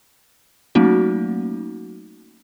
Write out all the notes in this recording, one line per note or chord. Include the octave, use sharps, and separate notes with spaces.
F#3 A3 A#3 C#4 D#4 F#4